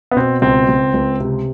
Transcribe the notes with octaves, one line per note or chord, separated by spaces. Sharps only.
B3
B2 C4
C#2 C4
C#2
C#2
C3